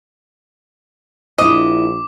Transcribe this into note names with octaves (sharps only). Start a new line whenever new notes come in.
A#1 D4 E4 D#5 D6